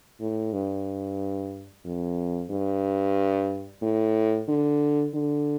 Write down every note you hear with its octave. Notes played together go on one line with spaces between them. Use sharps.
A2
G2
F2
G2
A2
D3
D3